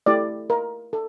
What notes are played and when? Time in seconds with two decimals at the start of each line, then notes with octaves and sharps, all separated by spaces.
0.06 A3 E4 G4 D5
0.50 A#4
0.93 A4